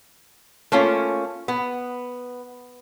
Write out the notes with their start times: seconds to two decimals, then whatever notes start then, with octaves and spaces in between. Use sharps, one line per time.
0.72 A3 A#3 C#4 F4
1.48 B3